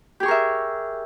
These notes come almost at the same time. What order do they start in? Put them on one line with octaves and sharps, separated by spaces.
G4 G#4 C#6 A#4 E5